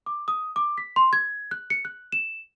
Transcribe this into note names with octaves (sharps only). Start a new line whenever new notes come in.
D6
D#6
D6
B6
C6
G#6
F#6
C#7
F#6
E7